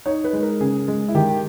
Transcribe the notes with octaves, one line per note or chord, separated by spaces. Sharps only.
D#4 C#5
B4
G#3
A#4
C#3 G#4
G#3
E4
D#3 G4